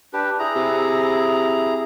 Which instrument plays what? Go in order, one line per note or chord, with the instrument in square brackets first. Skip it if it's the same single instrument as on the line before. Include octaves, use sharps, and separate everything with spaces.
[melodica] D4 G4 B4
E4 G#4 A#5
[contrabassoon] C3